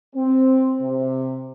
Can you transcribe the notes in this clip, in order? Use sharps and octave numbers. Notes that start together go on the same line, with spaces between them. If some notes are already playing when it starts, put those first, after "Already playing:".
C4
C3